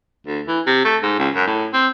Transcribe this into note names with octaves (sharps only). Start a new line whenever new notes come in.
D2
E3
C3
A3
G#2
C#2
F#2
A2
C4